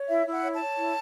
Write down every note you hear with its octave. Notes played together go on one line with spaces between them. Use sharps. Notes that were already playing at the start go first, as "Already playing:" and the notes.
Already playing: C#5
E4 E5
E4
F#5
C#5
A5
C#5
E4